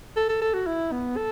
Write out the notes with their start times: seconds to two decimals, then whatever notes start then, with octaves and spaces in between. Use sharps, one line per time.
0.16 A4
0.29 A4
0.41 A4
0.54 F#4
0.67 E4
0.92 B3
1.16 A4